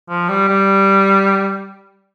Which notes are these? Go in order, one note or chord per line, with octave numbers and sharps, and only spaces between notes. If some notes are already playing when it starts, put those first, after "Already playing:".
F3
G3
G3